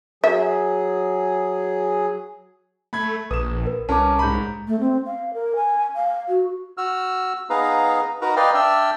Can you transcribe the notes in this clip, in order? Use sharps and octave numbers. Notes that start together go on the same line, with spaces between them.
F#3 G#4 E5
A3 B5 G#6
A#1 B4 D#6 E7
A#4 B4
C2 C#4 A#4 B4 A5 A#5 D6
G#2 A#5 B5 G6
A3
C4
F5
A#4
G#5
F5
F#4
F#4 E6 F6
B3 D#4 G#4 B4 F5 A#5
D#4 F#4 A#4 B4 A#5
B4 D5 D#5 F5 G5 F6
D4 D5 E5 G5 E6 F6